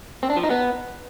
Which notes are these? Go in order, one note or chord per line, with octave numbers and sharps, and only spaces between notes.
C4
D4
F3
D#4
B3